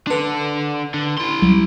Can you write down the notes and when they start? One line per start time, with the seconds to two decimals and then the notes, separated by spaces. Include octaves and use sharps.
0.07 D4 A4 B4 C6
0.94 D3
1.18 E4 C6
1.42 C2 F#3 G3